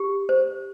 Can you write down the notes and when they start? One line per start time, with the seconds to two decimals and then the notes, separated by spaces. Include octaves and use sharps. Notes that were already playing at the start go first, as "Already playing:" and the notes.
Already playing: G4
0.29 C5